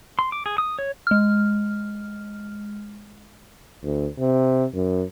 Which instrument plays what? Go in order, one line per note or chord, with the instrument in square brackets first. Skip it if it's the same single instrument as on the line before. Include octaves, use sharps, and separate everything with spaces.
[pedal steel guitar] C6
D6
G#4
D#6
C#5
[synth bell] G#3 F6
[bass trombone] D2
C3
F#2